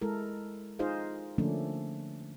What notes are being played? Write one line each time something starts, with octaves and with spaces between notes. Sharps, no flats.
G#3 E4 A4 A#4
D#4 F4 G#4 C5 D#5 F5
D3 F3 A3 A#3 C#4 D4